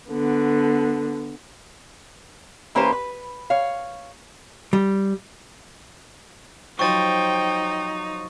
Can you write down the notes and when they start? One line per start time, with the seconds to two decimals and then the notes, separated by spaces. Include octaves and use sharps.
0.10 D3 B3
2.75 E3 A#3 C#4 G4 B4 C5
2.92 B4
3.50 C#5 F5
4.73 G3
6.79 F3 F#3 D#4 C5 G5 C#6 A6